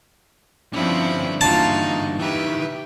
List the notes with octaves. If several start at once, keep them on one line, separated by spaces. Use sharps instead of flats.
G2 D3 F3 C4 C#4 E4
E3 A#3 D#4 F4 F#4 A5
D#3 E3 G4 B4 E5